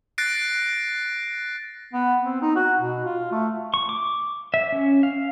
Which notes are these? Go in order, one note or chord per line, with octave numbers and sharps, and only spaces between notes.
F#6 A6 A#6 C7 D7
B3
C4
D#4
F#4
B2
F4
A3
C#6
D6
E5
C#4
F5